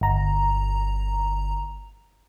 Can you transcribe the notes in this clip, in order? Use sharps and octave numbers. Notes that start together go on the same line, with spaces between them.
G1 A#5